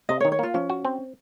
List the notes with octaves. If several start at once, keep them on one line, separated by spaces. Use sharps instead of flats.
C3 D#5
C#5
D#3
C#5
A#3 F4
F3 C#4
F#4
C4